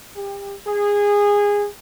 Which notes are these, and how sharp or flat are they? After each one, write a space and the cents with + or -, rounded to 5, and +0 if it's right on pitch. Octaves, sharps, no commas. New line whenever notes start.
G4 +30
G#4 -20